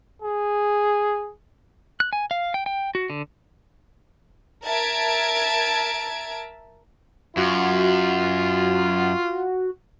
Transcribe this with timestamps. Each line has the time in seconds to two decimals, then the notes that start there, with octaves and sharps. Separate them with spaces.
0.22 G#4
2.00 F#6
2.13 G#5
2.31 F5
2.54 G5
2.66 G5
2.95 F#4
3.10 D3
4.65 A#4 E5 A5 G#6 D7
7.37 F#2 F4 F#4